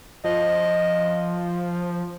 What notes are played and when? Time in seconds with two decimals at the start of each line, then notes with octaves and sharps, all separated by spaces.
0.24 F3 D#5